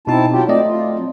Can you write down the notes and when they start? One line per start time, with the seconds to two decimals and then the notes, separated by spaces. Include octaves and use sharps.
0.07 B2 C4 D#4 E4 A5
0.32 F#3 F4 G4
0.48 A3 C4 D5 D#5
0.67 F4
0.95 F#3